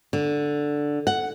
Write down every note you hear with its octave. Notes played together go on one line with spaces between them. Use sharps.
D3
F#5